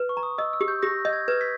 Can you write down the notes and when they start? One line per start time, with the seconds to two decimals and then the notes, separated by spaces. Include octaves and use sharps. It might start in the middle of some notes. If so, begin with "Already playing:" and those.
Already playing: B4
0.09 C#6
0.17 A#5
0.23 D#6
0.38 D#5 E6
0.53 E6
0.61 G4
0.68 G6
0.82 G4 A#6
1.05 D#5 G6
1.13 G#6
1.28 B4 G#6
1.41 B6